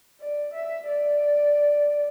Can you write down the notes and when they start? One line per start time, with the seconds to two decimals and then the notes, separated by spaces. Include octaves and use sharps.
0.20 D5
0.54 E5
0.87 D5